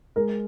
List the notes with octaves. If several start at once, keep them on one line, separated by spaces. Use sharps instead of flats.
G#3 A#4